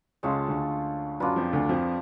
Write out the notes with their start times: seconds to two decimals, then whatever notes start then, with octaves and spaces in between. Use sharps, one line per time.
0.23 C#2 C#3 G#3 C#4 F4 A4
0.48 D2 D3
1.20 F#2 F#3 D4 F4 B4
1.36 F2 F3
1.52 D2 D3
1.69 F2 F3